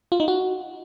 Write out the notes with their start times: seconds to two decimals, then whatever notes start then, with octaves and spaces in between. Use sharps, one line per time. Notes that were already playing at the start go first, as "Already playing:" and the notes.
0.12 F4
0.20 D#4
0.28 F#4